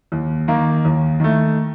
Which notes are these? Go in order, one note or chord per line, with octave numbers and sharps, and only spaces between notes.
D#2
D#3 A#3
D#2
D#3 A3